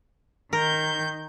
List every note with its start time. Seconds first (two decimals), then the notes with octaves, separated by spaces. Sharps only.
0.53 D#3 A#4 G6